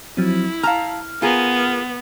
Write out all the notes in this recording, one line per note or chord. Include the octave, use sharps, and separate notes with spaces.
F3 F#3 C4 E4
F5 A5 A#5 F6
B3 F4 G#4 A#4